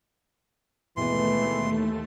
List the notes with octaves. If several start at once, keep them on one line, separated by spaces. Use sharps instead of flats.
D#2 B2 E3 G#3 A3 B3 C6